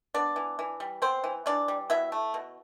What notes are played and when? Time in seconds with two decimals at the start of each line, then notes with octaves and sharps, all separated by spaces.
0.14 B3 D4 D5
0.36 E3
0.59 E3
0.80 G3
1.02 B3 C4 C5
1.24 E3
1.46 E3 D4 D5
1.68 G3
1.90 B2 E4 E5
2.12 A3
2.34 B2